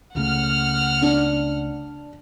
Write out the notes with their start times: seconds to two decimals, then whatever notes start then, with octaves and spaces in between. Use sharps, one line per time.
0.15 C#2 C#3 A3 F#5 F6
1.02 D4